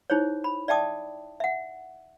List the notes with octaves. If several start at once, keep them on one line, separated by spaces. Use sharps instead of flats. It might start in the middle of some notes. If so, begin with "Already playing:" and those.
D#4 E4 G#4 C5 C#5
B5
D5 E5 G5 A5 D6 D#6
E5 F#5